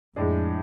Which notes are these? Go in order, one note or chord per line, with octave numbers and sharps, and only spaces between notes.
F2 A2 G#3 D4 G#4